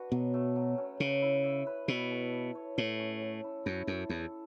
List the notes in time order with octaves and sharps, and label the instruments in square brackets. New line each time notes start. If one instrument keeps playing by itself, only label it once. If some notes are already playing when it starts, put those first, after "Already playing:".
Already playing: [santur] D4 F#4 B4
[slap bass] B2 [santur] F#3
[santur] A3
F#3
C#4
[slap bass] C#3 [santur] C#4
[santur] E4
E5
B4
[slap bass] B2 [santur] E4
[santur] A4
E5
C#5
[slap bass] A2 [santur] A3
[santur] C#4
A4
E4
[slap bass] F#2 [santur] E4
[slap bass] F#2 [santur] A4
[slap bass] E2 [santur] E4